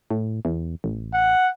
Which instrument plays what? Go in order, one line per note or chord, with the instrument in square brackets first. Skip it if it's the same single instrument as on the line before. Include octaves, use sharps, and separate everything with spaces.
[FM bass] A2
E2
A1
[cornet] F#5